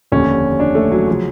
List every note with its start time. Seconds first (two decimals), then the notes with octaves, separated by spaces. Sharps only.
0.12 F1 D#2 D3 C#4
0.60 D4
0.75 A3
0.91 F#3
1.07 C#3 F3